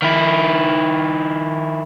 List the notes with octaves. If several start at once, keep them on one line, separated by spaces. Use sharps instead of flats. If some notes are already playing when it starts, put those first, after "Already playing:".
D#3 E4